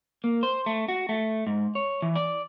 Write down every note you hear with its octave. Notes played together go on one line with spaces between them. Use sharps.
A#3
C5
A3
F#4
A3
G#2
C#5
E3
D5